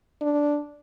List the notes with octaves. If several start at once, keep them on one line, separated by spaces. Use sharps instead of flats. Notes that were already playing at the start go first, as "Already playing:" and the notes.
D4